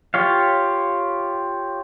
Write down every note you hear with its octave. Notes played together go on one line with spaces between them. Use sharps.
F4 G4 C#5 F5